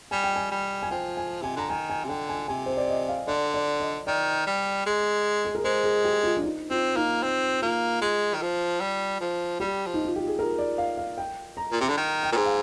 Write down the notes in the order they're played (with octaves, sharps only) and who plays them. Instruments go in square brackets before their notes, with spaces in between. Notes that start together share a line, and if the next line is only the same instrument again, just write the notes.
[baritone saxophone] G3 [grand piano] G#5
[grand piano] G5
G#5
[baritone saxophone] G3
[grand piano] G#5
[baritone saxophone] F3 [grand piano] G5
[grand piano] G#5
[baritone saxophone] C3 [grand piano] G#5
[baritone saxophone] D3 [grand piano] A#5
[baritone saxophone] D#3 [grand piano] G#5
[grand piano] G#5
[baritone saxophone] C3
[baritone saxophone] D3 [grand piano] G5
[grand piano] G#5
[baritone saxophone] C3 [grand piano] G#5
[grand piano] C5
D5
D#5
F5
[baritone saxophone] D3 [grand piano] D5
[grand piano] D5
D#5
[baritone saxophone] D#3 [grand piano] D5
[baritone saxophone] G3
G#3
[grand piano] G#4
A#4
[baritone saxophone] G#3 [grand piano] C5
[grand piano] G#4
G4
F4
D4
D#4
[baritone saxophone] C4 [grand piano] F4
[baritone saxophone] A#3 [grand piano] D#4
[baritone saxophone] C4
[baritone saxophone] A#3 [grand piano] F4
[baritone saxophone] G#3
D#3
F3
G3
F3
[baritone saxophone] G3 [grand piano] G4
[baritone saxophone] F3
[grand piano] D#4
F4
G4
G#4
A#4
D5
F5
F5
G5
A#5
[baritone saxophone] A#2
[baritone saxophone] C3 [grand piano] A#5
[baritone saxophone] D3
D#3
[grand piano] G5
[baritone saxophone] A#2
G#2
[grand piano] F5